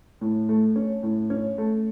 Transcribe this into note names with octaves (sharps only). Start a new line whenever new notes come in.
A2
A3
C#4
A2
C#4
A3